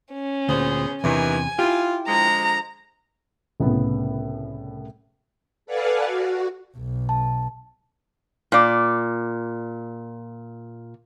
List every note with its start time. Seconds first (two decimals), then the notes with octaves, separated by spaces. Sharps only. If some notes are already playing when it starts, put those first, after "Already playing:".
0.14 C#4
0.49 D2 A#2 B3 G#4 C5
1.04 E2 G2 C3 D#3 E3 G#5
1.59 E4 F4 G4
2.08 D3 F3 G#3 A#5
3.60 C2 A2 C#3 B3
5.66 A4 B4 D5 F5 F#5 G#5
6.03 F#4
6.77 B1
7.09 A5
8.52 A#2 D5